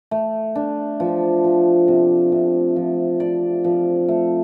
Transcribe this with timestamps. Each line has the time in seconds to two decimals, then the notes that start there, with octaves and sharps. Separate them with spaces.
0.11 A3
0.55 D4
1.00 F3
1.44 F3
1.88 C3
2.32 C3
2.76 F3
3.20 D5
3.64 F3
4.08 A3